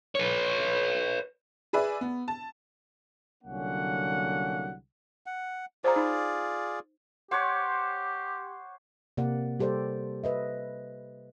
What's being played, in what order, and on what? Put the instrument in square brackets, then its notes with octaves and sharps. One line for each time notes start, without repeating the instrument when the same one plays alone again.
[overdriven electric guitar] B4 C#5
[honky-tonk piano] G#4 B4 D5 E5 G#5
B3
A5
[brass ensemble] C2 D3 F#3 A#3 C#4 F#5
[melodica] F#5
[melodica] F4 G#4 D5 [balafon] C5 A#5
[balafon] D#4
[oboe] G4 [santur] C5 C#5 C#6 [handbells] F#5 D6 F#6
[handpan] C3 A#3 D5 F#5
G3 G4 A4 C5 D5
B4 D#5 E5